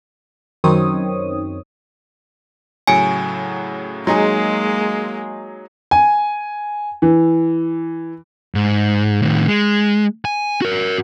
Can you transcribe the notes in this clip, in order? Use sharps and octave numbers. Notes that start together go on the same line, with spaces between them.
F#2 D#3 C4 C#5 D#6
A2 C#3 F#3 G#5 D7
F#3 G#3 A#3 D#4 G#4 C6
G#5
E3
G#2
A2 D#3
G#3
G#5
F#4 A#4